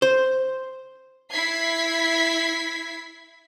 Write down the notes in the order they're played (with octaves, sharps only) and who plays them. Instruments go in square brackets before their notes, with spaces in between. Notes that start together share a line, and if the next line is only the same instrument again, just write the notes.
[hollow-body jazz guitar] C5
[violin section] E4 G#6 B6 C7